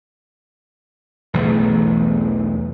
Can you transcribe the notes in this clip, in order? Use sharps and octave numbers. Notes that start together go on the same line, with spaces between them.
B1 E2 E3 A3